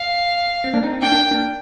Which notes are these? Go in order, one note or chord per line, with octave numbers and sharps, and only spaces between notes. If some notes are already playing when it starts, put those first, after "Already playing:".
Already playing: F5
C4
A#3 D4
C4 D#4
C4
A#3 D4 G5
A#3 D4
A#3 D4